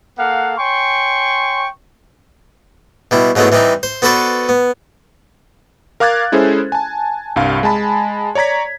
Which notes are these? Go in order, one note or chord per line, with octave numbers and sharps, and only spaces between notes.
A#3 A4 F5 F#5
C#5 G5 G#5 C6 C#6
B2 G3 E4
G#2 F#3 G#3 A3 B3 E4
E3 G3 C4 D#4
C5
B3 F#4 A4 B4 C5 D5
B3
A#4 F5 D6 F#6 G#6 A6
G#3 C#4 E4 G#4 A4 C5
G#5 A5
C2 G2 F5
G#3 G#5 A5 B5
C#5 D5 A#5 G#6 B6